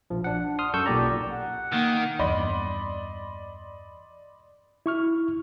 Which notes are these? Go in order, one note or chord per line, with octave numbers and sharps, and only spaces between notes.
A#1 F3
D4 F#5
C6 D#6 F6
F#2 A4 C#6 E6 G6
B1 A#2 G4 D5 A#5
F#5
D#3 A#3
E2 G2 D5 D#5 B5 C6
E4 C#6 F6